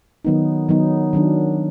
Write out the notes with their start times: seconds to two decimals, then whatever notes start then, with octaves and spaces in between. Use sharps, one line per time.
0.25 D#3 F#3 B3 D#4
0.69 D#3 F#3 B3 D#4
1.13 D#3 F#3 D4